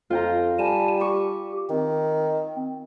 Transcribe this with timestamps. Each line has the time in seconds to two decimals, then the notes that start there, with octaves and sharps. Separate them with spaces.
0.10 F2 F4 G5 A#5
0.59 G3 G#5 A5
1.01 G4 C#6
1.70 D#3 C4